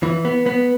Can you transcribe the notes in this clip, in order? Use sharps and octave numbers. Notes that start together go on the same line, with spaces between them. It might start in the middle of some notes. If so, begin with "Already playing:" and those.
E3
B3
B3